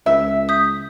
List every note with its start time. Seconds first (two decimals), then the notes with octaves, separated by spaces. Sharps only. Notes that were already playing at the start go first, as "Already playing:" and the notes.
0.06 C#2 E5
0.49 D#6 G6 B6